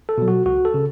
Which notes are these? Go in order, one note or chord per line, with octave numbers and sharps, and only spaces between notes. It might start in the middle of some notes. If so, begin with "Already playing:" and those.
A4
B2 F#3
F#4
C#2 F#4
A4
C#3